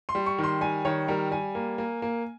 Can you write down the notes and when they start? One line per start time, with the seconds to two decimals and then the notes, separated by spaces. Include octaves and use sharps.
0.09 C6
0.15 G3
0.26 C#6
0.38 D#3
0.44 C6
0.61 G3 G#5
0.85 D#3 C#5
1.08 G3 A#4
1.31 G3 G#5
1.55 A#3
1.78 A#3
2.02 A#3